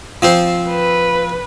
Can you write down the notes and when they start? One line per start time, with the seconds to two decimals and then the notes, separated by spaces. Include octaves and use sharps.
0.22 F3 C4 C5
0.69 B4